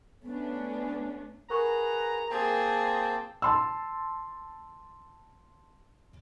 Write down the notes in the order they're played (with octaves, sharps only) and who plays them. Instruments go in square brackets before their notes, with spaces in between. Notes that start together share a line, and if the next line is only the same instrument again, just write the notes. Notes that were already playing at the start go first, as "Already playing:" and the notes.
[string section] A3 C#4 D4 [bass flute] B3
[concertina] G#4 B4 F#5 [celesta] A#4 C#6 [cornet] A#5
[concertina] A#3 G5 A5 [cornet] C4 [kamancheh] G#4
[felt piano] A5 C6 E6